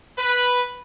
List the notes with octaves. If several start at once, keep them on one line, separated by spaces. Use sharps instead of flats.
B4